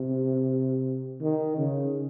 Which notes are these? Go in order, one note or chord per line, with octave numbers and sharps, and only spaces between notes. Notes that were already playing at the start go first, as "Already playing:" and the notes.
Already playing: C3
D#3
C#3